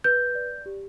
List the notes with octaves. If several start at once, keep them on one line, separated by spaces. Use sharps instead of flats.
B4 G6
D5
G4